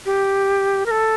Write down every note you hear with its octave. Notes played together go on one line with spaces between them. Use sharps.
G4
A#4
A4